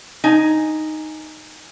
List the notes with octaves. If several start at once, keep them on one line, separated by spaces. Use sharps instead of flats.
D#4 G#5